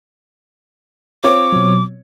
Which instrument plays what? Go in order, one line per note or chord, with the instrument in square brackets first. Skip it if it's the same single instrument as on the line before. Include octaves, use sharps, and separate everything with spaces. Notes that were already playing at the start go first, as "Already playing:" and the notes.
[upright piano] C4 F4 C#5 [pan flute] D6
[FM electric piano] B2 F#3